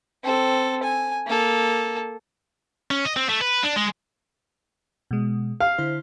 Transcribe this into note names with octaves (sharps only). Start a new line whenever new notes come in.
C4 A4
G#5
A#3 A4
C#4
D#5
C4
A3
B4
D4
G#3
B2 G#3
F5
D3 E4 C5